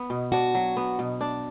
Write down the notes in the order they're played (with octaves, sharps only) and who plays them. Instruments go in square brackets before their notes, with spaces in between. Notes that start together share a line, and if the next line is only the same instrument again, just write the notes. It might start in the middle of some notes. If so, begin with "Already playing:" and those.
Already playing: [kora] B3
B2
[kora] D4 [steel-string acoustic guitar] F#4
[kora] F#3
B3
B2
D4